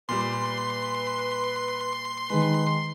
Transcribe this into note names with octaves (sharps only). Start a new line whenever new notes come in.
A#2 G3 B4 C6
D#3 G#3 B4
C6